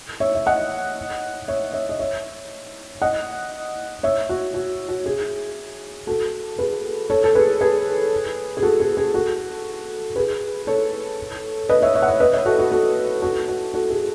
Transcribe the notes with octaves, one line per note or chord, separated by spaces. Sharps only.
C#5 E5
E5
D#5 F#5
C#5 E5
C#5 E5
D#5
C#5 E5
D#5 F#5
C#5 E5
F#4
F#4
F#4
G#4
F#4 A4
G#4 B4
A4 C#5
A4
G#4 B4
G#4 B4
G#4
F#4 A4
G#4
G#4
F#4 A4
G#4 B4
A4 C#5
B4 D#5
C#5 E5
C#5 E5
F#5
C#5 E5
B4 D#5
C#5 E5
F#4 A4
F#4
F#4 A4
F#4 A4
F#4
F#4 A4
G#4